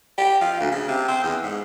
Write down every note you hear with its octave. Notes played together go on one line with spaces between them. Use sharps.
G4
F3
D2
C#3
C3
C4
E2
G#2